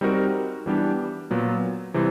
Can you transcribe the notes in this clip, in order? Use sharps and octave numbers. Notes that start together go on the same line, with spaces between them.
G3 C4 D#4 F#4 A#4
E3 G3 B3 D4 G4
A#2 F#3 B3
C3 E3 G3 C4